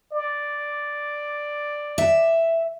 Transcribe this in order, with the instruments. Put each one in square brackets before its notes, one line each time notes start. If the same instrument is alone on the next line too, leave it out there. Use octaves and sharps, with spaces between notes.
[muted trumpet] D5
[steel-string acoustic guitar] E5